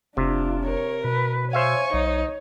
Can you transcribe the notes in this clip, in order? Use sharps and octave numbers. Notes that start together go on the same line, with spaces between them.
F1 C3 D4 F4
A#4 C#5
B2 B4
C5 C#5 E5 F5 G#5 C#6
B1 D#4